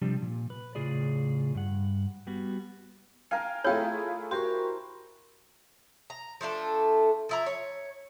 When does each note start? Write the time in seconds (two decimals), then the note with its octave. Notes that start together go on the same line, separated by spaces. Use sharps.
0.01 C3 F3 G3 D4
0.22 A#2
0.50 B4
0.75 A2 C#3 F4 G#4 D5
1.55 G2 F#5
2.27 G3 B3 F#4
3.31 A#4 F5 G5 G#5
3.64 A3 E4 F4 G#4 C#5 G5
4.31 F#4 G4 A#4 C5 C#6
6.10 A#5
6.41 F3 A3 D4 A4
7.29 F3 E4 A#5
7.46 C#5